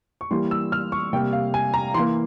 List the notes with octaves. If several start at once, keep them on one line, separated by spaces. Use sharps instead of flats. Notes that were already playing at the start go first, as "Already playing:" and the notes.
C#6
E3 G3 A#3 C6
E6
F6
C#6
C3 G3 A#3 G5
F5
G#5
A#5
E3 A#3 C6